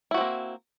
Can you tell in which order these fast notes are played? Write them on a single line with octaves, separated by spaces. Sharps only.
E4 F#4 C4 A#3